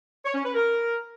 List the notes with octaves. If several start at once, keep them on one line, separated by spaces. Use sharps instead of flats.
C#5
C#4
B4
A#4